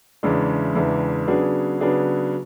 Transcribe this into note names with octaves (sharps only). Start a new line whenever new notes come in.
E2 C#3 E3 G#3 D4
E2 C#3 E3 G#3 D4
C#3 F#3 B3 D4 G#4
C#3 F#3 B3 D4 G#4